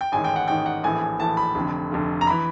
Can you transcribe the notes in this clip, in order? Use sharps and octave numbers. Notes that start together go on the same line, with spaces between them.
G5
A1 G#2 D#3 G#5
G5
F#5
A1 G#2 D#3 G5
F#5
A#1 A2 E3 G#5
G#5
A#1 A2 E3 A5
B5
F1 F2 D3
F1 F2 D3
A#5
E3 B5